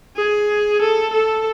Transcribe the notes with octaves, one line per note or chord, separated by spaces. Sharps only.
G#4
A4
A4